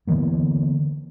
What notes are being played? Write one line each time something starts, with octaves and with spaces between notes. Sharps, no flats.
D3 E3 A#3 B3